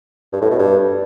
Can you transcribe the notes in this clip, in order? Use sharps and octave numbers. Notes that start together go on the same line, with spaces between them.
G2
A2
B2
G2